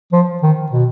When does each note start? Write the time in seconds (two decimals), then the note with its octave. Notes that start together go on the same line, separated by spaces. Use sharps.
0.12 F3
0.43 D#3
0.72 B2